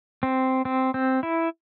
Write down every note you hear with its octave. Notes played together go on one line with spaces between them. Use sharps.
C4
C4
C4
E4